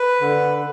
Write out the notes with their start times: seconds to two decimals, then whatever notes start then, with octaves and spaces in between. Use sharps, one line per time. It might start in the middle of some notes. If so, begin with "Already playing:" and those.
Already playing: B4
0.21 D3